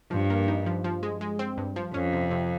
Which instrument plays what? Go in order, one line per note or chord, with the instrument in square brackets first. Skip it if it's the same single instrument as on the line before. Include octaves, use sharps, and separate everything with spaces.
[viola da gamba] G2 [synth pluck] F3
[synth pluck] A#3
D#4
F3
F3
G#3
G#3
C4
G2
F3
[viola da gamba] F2 [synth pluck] C#4
[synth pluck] C3
C3